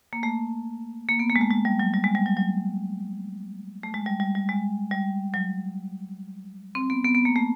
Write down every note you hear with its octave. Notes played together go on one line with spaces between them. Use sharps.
A#3
A3
A#3
B3
A#3
G#3
A3
G#3
G3
F#3
G3
G#3
G3
F#3
F#3
A3
G#3
G3
G3
G3
G#3
G3
F#3
C4
B3
B3
B3
A#3
A3